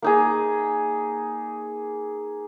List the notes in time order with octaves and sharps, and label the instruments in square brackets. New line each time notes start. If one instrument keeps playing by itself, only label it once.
[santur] A#3 D#4 G#4